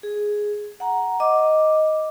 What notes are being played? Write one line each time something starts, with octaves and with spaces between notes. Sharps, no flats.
G#4
F#5 A#5
D#5 D6